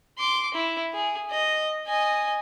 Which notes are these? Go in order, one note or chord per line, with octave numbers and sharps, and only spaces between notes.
C6 D6
E4
G#4
D#5
D#5 G#5